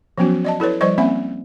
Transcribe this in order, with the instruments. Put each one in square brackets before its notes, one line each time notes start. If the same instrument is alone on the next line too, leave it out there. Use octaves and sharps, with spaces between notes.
[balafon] F3 F#3 B3 C#4 F#4
D5 D#5 A5
E4 A4 B4 C#5
F3 G3 C5 D5 D#5 C#6
A#3 C4 C#4 E5 B5